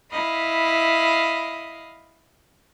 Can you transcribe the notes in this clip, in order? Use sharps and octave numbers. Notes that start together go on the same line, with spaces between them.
E4 D#5 F5 B5